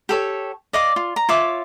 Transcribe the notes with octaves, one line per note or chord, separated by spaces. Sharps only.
G4 A4 C#5
D5 D#5 F5 D6
F4
A#5
F4 C#5 E5 D6